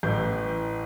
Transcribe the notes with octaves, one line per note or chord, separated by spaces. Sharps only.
A1 A2 E3 G6